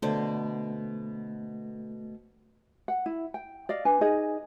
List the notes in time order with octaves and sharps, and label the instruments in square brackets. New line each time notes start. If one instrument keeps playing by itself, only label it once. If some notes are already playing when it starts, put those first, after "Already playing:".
[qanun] B2 D3 C5 [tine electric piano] A3
[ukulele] F#5
E4
G5
D5 D#5 F5
D4 B4 G#5
D#4 G#4 D#5